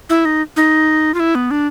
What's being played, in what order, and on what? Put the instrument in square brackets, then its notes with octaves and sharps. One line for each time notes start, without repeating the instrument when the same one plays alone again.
[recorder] E4
D#4
D#4
F4
E4
B3
D4